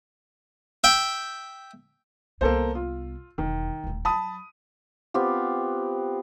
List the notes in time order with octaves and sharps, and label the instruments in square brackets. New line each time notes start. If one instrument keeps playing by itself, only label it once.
[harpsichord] E5 G5
[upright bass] C2 B3 [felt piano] A#3 A4 C5
[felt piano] F4
[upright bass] E1 [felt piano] D#3
[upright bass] D#1 A3
[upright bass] F#3 [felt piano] A5 B5 D#6
[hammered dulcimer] B3 C4 F4 G4